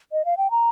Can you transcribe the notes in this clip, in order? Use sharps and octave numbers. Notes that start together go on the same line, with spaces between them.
D#5
F5
G5
A#5